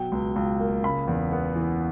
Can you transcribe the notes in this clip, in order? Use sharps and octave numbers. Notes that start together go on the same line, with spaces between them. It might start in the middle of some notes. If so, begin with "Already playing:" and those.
Already playing: B2 F#3 G5
C#2
C#2
A#3
C#3 B5
E2
B3
E3